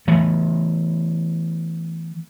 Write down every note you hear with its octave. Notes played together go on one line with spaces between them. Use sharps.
E3 A3 B3